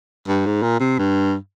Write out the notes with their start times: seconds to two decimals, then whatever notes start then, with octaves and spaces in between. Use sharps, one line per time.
0.28 G2
0.46 G#2
0.62 A#2
0.80 C3
0.98 G2